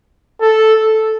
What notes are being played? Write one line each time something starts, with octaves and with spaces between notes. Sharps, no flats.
A4